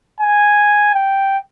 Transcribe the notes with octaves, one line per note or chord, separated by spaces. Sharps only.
G#5
G5